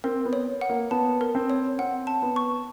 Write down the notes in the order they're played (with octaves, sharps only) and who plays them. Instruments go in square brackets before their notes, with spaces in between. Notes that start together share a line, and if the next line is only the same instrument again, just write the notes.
[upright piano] C4 [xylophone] A#4
[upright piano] B3
[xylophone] C#5
F#5
[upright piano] A#3
[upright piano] B3 [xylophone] A5
[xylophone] A#4
[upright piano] C4
[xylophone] C#5
[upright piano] C4 [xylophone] F#5
[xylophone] A5
[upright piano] B3
[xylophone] C#6